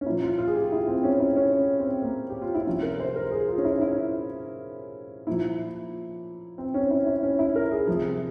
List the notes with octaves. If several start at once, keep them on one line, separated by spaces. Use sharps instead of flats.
C#4
A#2 F3 E4
F4
F4
G#4
G4
E4
C4
C#4
E4
C#4
C4
A#3
G4
F4
E4
C3 F3 C#4
A#4
C5
A#4
G#4
F4
C#4
E4
E4
A#2 F3 E4
C4
C#4
E4
E4
C#4
E4
A#4
G#4
C3 F3